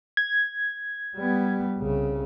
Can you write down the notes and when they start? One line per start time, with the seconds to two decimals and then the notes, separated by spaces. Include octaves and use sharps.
0.17 G#6
1.17 G3 B3
1.78 C2 C#3